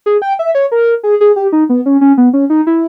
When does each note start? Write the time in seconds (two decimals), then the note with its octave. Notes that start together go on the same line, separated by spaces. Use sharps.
0.06 G#4
0.22 G5
0.39 E5
0.55 C#5
0.72 A#4
1.03 G#4
1.21 G#4
1.36 G4
1.53 D#4
1.69 B3
1.86 C#4
2.01 C#4
2.18 B3
2.33 C#4
2.50 D#4
2.67 E4